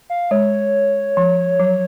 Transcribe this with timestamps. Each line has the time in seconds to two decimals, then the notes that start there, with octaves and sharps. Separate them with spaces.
0.10 F5
0.31 G#3 C#5
1.17 F3
1.60 F#3